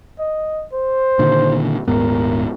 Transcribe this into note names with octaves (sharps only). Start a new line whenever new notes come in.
D#5
C5
A#2 D3 D#3
D#1 G#2 B3 A#4